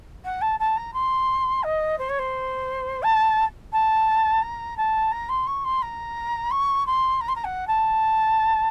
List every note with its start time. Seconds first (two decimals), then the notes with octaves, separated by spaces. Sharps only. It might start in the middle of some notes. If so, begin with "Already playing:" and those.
0.24 F#5
0.41 A5
0.59 A5
0.77 A#5
0.93 C6
1.63 D#5
1.98 C5
2.09 C#5
2.19 C5
3.03 A5
3.73 A5
4.42 A#5
4.77 A5
5.12 A#5
5.29 C6
5.47 C#6
5.64 C6
5.82 A#5
6.51 C#6
6.86 C6
7.21 A#5
7.28 C6
7.35 A#5
7.44 F#5
7.67 A5